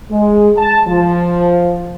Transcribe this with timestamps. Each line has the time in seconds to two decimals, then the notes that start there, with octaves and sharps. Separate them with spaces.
0.11 G#3
0.57 A5
0.88 F3